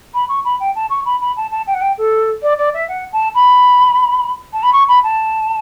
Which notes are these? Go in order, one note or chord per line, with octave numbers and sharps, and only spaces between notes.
B5
C#6
B5
G5
A5
C#6
B5
B5
A5
A5
G5
F#5
G5
A4
D5
D5
E5
F#5
A5
B5
A5
B5
C#6
B5
A5